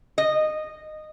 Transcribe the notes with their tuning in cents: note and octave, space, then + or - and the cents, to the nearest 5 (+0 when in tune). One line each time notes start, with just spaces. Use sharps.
D#5 -15